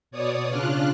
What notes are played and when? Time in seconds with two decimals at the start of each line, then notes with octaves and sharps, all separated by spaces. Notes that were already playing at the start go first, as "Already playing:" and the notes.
0.11 B2 C#5 D5 D#6
0.49 C#3 D4 F4 F6 F#6